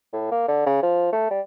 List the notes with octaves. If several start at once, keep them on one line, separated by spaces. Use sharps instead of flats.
A2
A#3
D3
C#3
F3
A3
G3